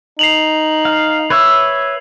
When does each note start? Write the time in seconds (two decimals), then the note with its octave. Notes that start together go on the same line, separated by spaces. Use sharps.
0.19 D#4 C7 F7 F#7
0.85 F5
1.30 B4 C#5 E5